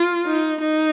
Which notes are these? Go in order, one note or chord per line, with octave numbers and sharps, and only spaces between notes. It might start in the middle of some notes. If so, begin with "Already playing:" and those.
Already playing: F4
D#4
D#4